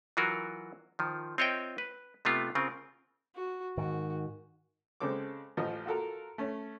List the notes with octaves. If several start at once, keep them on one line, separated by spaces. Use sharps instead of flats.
E3 F#3 F4 F#4 A#4
D#3 F3
C4 F4 C#5 D#5 E5 G5
B4
C3 A3 B3 F4
C#3 C4 F4 A#4
F#4
G#2 D#3 F#4
C#3 G#3 C4 A4 D6
A1 F3 D#5
F4 F#4 A4 A#4
A3 C#4